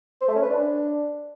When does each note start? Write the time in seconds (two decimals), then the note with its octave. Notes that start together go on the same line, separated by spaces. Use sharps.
0.21 C5
0.28 A3
0.35 C#4
0.43 B4
0.50 D4